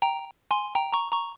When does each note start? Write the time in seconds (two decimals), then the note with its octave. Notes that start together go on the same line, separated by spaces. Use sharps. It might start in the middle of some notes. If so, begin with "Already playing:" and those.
0.02 G5 A#5
0.51 G#5 C6
0.75 G5 A#5
0.93 A#5 C#6
1.12 A#5 C#6